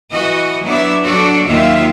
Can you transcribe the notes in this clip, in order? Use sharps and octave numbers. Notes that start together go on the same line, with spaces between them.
E3 F#4 D#5
F#3 B3 D4 E4 D5 E5
F#3 D4 F#4 A4 D5
D#2 D#3 F#3 F4 E5 F5